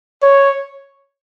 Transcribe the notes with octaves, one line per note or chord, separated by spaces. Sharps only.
C#5